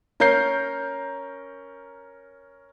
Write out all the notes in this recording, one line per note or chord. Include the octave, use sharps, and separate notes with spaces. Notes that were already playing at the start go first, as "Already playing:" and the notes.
C#4 A#4 A#5 G6 C7